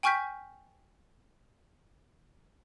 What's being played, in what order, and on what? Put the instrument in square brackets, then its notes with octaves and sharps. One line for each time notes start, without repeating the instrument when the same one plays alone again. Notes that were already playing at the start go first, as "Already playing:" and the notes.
[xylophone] G5 G#5 C#6 F6 G6 B6